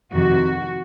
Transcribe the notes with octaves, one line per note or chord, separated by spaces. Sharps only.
F2 C3 D#3 F#4